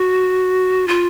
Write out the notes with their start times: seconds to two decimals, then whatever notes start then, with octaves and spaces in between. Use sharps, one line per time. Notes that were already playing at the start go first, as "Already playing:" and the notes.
Already playing: F#4
0.88 F4